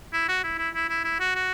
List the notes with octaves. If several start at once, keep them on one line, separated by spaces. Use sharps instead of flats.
E4
F#4
E4
E4
E4
E4
E4
F#4
F#4